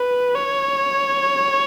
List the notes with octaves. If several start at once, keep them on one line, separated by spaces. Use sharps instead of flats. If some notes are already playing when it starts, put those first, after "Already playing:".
Already playing: B4
C#5